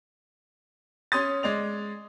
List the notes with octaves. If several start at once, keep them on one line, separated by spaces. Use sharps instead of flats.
C#4 C6 D#6 A6
G#3 D5 F7